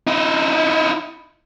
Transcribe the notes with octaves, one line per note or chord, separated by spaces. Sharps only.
D#4 E4